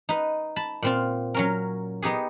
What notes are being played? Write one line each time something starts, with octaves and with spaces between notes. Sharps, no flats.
D#4 B4
A5 B5
A#2 C4 F4
F#3 C#4 A#4
B3 D#4 G4 G#4